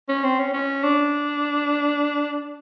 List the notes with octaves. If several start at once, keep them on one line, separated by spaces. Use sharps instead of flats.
C#4
C4
C#4
C#4
D4